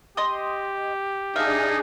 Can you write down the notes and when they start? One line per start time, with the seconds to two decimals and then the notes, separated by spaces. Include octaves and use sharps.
0.17 G4 D#5 C6 D#6
1.36 D4 D#4 G#4 E5 F5